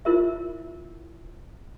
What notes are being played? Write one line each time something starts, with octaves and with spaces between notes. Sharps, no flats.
E4 F4 A#4 C5 E5